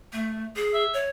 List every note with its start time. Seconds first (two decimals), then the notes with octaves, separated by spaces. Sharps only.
0.13 A3
0.56 G#4
0.74 E5
0.94 C#5